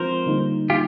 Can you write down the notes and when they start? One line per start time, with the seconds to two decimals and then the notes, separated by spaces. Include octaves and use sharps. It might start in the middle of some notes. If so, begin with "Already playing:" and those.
Already playing: F3 G#3 C4 F4 A#4 C5
0.26 D3 G3 A#3 D#4
0.70 F4 G4